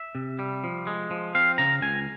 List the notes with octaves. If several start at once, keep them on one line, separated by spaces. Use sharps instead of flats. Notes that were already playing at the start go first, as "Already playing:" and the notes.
Already playing: E5
C3
G3
F3
G#3
F3
C4 F5
C#3 A#5
C#2 G#5